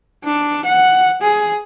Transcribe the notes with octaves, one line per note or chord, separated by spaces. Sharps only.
D4
F#5
G#4